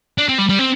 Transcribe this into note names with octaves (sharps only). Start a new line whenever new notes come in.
D4
C4
G3
G3
C4